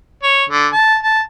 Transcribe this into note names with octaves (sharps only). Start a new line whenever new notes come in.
C#5
D3
A5
A5